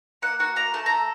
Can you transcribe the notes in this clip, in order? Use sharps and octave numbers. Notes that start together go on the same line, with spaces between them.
A#3 F#5
F#4 F#5
A#3 A#5
A3 A5
A4 A#5